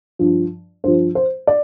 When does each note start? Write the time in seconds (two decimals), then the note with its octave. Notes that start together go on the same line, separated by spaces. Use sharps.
0.19 G2 F3
0.84 G2 F3 C5
1.15 C5
1.47 D5